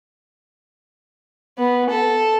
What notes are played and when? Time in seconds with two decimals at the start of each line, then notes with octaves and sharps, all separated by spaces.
1.58 B3
1.90 A4